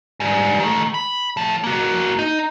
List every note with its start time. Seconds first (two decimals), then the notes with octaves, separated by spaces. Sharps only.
0.20 G#2 G3
0.60 D#3 A3
0.94 B5
1.37 A2 F3
1.64 A#3 F#4
2.19 D#4